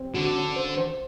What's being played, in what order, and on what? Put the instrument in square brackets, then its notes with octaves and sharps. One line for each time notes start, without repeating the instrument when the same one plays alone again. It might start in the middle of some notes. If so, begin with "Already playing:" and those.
Already playing: [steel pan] C4
[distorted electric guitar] D3 [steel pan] F#4
[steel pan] C#4
C5
C5